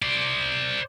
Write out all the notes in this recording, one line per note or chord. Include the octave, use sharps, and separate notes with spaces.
C5 D5